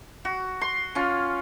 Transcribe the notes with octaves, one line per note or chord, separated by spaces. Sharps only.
F#4
C6
C#4 F4